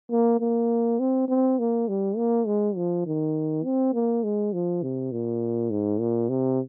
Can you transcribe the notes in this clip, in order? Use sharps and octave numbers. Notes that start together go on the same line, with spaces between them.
A#3
A#3
C4
C4
A#3
G3
A#3
G#3
F3
D#3
C4
A#3
G#3
F3
C3
A#2
G#2
A#2
C3